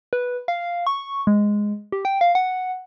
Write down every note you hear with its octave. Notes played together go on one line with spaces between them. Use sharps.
B4
F5
C#6
G#3
G4
G5
F5
F#5